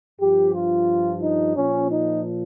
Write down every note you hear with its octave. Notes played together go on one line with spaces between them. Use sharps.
G2 F3 G4
F4
D#4
A#2 F3 C#4
D#4